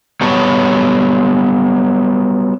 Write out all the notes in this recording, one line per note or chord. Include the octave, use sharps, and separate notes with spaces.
F#3 G3 B3 C#5 A5